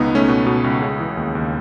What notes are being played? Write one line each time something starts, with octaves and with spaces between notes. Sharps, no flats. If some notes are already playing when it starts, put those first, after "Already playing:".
Already playing: C#2 B2 B3 D#4
C#2 A3 C#4
B2
B2
C#2
C#3
E3
D#2
D#2